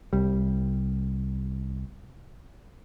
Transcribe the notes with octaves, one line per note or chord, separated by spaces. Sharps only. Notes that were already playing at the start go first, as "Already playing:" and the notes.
C2 G3